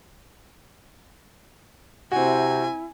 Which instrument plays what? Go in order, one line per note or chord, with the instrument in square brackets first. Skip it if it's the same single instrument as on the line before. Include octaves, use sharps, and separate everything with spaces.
[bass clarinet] C3 [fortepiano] C4 F#4 [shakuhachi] E4 [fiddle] G#5